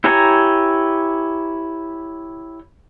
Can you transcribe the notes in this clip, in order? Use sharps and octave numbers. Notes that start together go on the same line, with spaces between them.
E4 G4 C#5 G#5 A#5